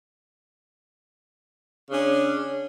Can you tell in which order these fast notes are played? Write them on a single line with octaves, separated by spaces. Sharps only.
C#3 D4 C#4